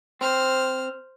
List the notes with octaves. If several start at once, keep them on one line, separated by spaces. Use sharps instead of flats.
C4 C5 F6